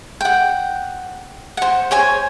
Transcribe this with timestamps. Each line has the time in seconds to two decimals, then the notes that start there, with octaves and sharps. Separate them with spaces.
0.21 F#5 G5
1.57 C5 F#5
1.91 C5 C#5 G#5